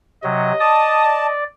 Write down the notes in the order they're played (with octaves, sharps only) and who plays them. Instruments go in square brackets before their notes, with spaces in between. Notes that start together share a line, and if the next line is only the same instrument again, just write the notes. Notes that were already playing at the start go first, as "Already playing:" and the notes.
[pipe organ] C3 F#3 [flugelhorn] D#5
[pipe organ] D5 D#6 [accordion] A5
[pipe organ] D5